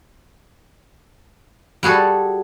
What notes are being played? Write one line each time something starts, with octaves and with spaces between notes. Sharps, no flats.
G3 F#4 G#4 A4